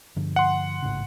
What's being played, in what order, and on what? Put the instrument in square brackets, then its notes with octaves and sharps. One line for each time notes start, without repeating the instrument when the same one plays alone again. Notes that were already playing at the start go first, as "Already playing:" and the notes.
[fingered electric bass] G2 D3 F3
[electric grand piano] F#5 C6
[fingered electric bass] A1 G#2 C#3